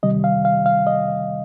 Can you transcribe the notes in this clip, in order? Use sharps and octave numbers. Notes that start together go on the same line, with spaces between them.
C3 D#3 G3 D#5
F5
F5
F5
D#5